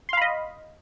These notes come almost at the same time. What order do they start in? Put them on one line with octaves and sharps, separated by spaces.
C6 F5 B5 D#5